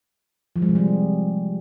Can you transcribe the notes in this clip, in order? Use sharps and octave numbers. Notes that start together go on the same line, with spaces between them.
F3
G#3
C3
G3